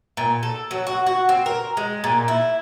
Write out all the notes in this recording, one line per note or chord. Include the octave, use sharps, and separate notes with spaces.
A#2
A4
F#3
F#4
F#4
C4
A#4
G#3
A#2
E4